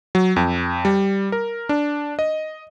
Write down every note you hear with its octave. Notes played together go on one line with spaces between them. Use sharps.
F#3
F2
G3
A#4
D4
D#5